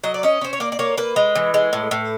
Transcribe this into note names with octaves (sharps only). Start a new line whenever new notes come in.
F#3 D#5
D5
C#4 D#5
C#4 C5
C#5
A#3 D5
D5
A#3 C#5
A#3 B4
G#3
E3
G#3
A2
A2